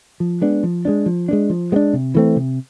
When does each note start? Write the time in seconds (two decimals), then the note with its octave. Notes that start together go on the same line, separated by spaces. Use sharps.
0.20 F3
0.42 G#3 B3 D4
0.63 F3
0.85 G#3 B3 D4
1.06 F3
1.28 G#3 B3 D4
1.50 F3
1.72 G#3 B3
1.76 D4
1.93 C3
2.15 E3 A3 C4
2.36 C3